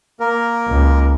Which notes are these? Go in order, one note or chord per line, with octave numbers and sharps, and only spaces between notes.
A#3 A#4
C#2